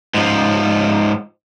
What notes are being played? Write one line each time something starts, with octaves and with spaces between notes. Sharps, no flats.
G#2 F3